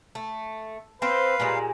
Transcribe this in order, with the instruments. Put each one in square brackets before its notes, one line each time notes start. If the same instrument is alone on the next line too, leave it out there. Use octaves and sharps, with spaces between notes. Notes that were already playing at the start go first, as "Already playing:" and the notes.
[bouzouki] A3
[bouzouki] C4 C5 [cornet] B4 [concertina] F5
[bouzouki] A#2 G3 G#3